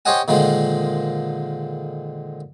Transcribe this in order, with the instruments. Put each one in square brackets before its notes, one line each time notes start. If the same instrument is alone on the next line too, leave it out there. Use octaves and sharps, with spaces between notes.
[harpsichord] G4 C5 C#5 D#5 F#5 G#5
A#2 D3 D#3 F3 G#3